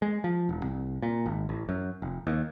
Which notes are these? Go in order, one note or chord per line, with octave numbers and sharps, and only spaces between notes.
G#3
F3
E1
C2
A#2
G#1
A1
F#2
F1
D#2